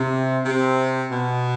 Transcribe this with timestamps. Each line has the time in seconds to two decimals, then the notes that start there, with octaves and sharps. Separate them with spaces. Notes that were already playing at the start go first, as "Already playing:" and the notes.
Already playing: C3
0.45 C3
1.10 B2